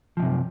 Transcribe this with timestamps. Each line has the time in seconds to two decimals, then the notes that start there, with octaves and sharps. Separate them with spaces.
0.17 F3
0.19 A2
0.22 C3
0.24 F#2